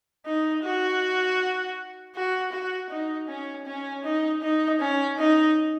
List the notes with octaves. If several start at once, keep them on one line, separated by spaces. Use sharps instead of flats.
D#4
F#4
F#4
F#4
D#4
C#4
C#4
D#4
D#4
C#4
D#4